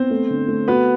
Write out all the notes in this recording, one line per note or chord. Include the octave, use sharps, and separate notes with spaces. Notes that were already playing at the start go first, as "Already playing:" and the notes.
Already playing: B3 C4 C5
A3
D3
A3
B3 F#4 B4